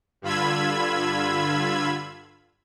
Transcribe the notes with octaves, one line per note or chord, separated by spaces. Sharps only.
G2 D3 F4 B5 E6 G#6